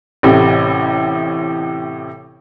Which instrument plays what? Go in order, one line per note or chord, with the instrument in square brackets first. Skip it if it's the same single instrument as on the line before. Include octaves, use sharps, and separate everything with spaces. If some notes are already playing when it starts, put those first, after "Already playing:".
[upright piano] A1 A2 C3